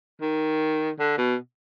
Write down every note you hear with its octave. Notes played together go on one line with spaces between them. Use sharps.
D#3
D3
B2